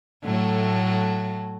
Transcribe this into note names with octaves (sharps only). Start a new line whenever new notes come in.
A2 F#3 A3